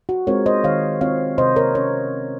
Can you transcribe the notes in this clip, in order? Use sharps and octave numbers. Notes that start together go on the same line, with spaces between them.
F#4
G#3 C4 F4 A#4 C#5
C5 D#5
D#3 C#5 F5
G#3 C4 F4 C#5 F5
C3 C5 D#5
A#4 C#5
C#4 A#4 C#5